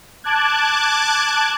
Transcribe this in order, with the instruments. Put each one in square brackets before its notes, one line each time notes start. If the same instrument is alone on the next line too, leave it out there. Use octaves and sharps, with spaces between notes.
[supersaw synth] A5 D6 F#6 G#6